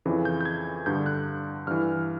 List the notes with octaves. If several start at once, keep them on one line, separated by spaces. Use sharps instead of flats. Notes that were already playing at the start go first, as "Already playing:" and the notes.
F2 C#3 E3
G6
G6
G#6
G2 D3 G6
F#6
G2 E3 F6